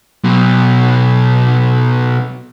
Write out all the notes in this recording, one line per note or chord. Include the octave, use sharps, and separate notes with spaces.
B2 F#3